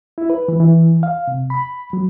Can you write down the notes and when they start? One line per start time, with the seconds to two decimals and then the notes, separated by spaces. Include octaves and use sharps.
0.18 E4
0.30 B4
0.48 E3
0.60 E3
1.03 F5
1.28 C3
1.50 B5
1.93 F#3